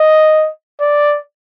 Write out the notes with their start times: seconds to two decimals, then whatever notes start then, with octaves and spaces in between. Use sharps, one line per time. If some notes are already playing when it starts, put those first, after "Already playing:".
Already playing: D#5
0.81 D5